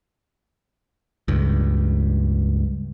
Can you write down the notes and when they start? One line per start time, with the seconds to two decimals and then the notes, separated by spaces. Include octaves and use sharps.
1.28 C#2 G2